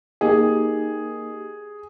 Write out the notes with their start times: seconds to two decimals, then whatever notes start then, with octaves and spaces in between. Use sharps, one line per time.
0.21 A#3 D#4 G4 G#4